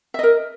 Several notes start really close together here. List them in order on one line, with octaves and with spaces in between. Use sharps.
E5 D#5 A#4